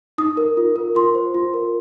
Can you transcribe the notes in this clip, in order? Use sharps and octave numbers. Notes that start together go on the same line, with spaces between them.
D#4 D#6
A#4
F4
A#4
F4 C6
C5
F4
A#4